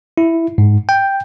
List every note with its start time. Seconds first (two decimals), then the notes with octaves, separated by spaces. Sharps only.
0.18 E4
0.58 G#2
0.89 G5